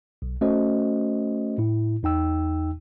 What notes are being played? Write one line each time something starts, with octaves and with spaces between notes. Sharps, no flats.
B1
A3 C#4 F#4 C5 D#5
A2 E4
E2 D#4 G5 E6